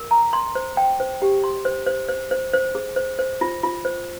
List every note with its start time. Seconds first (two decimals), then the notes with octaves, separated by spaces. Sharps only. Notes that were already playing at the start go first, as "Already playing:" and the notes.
Already playing: A#4
0.11 A#5
0.33 C6
0.55 C5
0.77 G5
1.00 C5
1.22 G4
1.44 C6
1.65 C5
1.87 C5
2.09 C5
2.31 C5
2.53 C5
2.75 G#4
2.96 C5
3.19 C5
3.41 F4
3.63 F4
3.85 C5